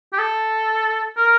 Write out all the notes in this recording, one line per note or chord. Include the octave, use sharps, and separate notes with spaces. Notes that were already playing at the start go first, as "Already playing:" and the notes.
G4
A4
A#4